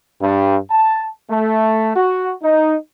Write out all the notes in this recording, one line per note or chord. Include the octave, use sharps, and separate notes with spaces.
G2
A5
A3
F#4
D#4